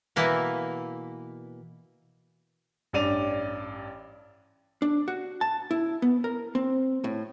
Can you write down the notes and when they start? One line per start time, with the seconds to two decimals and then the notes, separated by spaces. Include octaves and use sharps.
0.16 B2 E3 A#3 E4
2.93 A1 G2 D5 D#7 F7
4.82 D4
5.08 F#4
5.41 A5
5.71 E4
6.02 B3
6.24 A#4
6.55 C4
7.04 A2